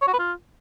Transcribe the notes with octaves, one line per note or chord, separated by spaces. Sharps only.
C#5
F#4
B4
F4